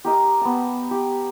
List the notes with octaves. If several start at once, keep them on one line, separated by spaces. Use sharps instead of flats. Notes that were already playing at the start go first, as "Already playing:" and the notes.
G4 A#4 D#5
B3 A5
G4